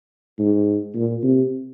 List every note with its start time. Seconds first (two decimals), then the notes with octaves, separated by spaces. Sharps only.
0.39 G#2
0.95 A#2
1.23 C3